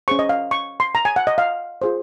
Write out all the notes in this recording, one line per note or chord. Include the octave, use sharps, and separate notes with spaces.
C#4 G#4 C5 C#6
D#5
F5
C#6
C6
A#5
G#5
F#5
D#5
F5
F4 G#4 C5